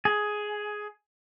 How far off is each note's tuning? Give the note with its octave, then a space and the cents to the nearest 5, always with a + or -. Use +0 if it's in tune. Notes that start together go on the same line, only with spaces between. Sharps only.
G#4 +10